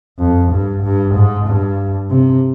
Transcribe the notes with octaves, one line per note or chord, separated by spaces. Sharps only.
F2
G2
G2
G#2
G2
C3